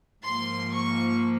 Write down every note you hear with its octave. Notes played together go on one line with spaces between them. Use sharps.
G#2 F3 A#3 C6
C#6